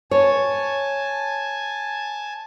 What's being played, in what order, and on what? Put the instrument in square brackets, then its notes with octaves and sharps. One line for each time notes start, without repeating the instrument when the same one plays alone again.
[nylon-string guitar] C#5 [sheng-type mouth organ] G#5 A5